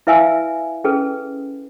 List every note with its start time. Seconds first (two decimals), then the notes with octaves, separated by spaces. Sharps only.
0.07 E4 B4 E5 F5 G#5 E6
0.84 C#4 G#4 A4 B4